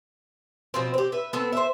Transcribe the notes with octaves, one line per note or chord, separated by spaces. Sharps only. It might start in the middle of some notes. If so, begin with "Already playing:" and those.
B2 F3 C4
C4 G4
B4 E5
B3 C4 A4
C5 E5